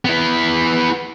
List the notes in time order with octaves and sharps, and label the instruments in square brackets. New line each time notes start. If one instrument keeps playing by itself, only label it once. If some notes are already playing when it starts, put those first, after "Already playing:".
[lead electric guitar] B3 E4